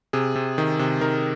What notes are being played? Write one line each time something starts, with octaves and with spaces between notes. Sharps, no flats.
C3 G#4
C3
D#3
C3
D#3 A#4